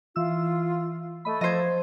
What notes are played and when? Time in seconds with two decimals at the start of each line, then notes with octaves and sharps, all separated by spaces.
0.16 E3 F4 E6
1.25 A3 D#5 B5
1.41 F3 C5 D#5 G#6